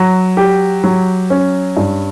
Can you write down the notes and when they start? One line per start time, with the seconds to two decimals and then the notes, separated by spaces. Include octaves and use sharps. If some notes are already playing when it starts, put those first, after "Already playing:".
Already playing: F#3
0.37 G4
0.84 F#3
1.30 C#4
1.77 G2